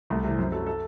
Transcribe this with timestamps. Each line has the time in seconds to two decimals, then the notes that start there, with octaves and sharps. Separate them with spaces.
0.10 C2 A3
0.24 C3 E3
0.38 F#2 C4
0.52 F#3 A4
0.66 A4